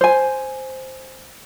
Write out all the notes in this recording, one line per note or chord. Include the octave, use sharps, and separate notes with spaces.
C5 G#5